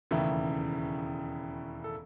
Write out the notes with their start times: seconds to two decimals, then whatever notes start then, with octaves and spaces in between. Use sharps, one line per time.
0.11 E1 D#2 C#3 E3 A3
1.84 A4